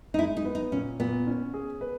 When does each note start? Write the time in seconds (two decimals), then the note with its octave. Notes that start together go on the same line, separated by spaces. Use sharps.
0.14 D#4
0.19 G#3 E4
0.37 D#4
0.45 B3
0.55 D#4
0.72 A#2 C#4
1.00 A#2 B3
1.27 C#4
1.54 G#4
1.81 B4